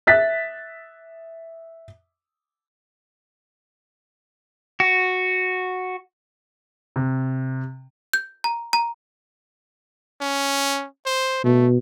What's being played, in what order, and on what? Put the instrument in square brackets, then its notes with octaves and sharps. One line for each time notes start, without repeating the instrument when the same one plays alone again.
[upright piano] E5 F#6 A6 B6
[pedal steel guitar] F#4
[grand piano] C3
[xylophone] G6
A#5
A#5
[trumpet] C#4
C5
[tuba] B2 [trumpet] A3